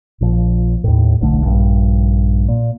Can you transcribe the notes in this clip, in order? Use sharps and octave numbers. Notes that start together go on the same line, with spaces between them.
A#1 A#2 F3
D#2 A2
D1 B1 D3 A3
A#1 G2
A#2